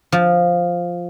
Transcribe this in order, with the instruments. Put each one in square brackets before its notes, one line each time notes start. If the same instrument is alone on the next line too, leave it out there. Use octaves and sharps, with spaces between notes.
[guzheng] F3